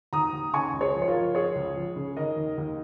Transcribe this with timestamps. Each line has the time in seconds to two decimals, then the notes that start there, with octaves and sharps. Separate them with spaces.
0.13 D#2 A#5 D#6
0.33 D#2
0.53 C#3 G#5 C#6
0.73 C#2
0.81 G#4 C#5
0.95 F3
1.02 C#5
1.08 F4 A#4
1.15 F3
1.35 F3 G#4 C#5
1.55 C#2
1.76 F3
1.96 C#3
2.16 D#3 A#4 D#5
2.36 D#2
2.58 D#2